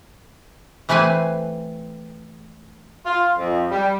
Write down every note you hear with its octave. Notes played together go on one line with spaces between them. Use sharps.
E3 A3 C4 B4 G#5
F4
F2
G3